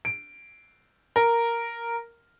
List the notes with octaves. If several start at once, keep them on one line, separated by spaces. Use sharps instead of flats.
D7
A#4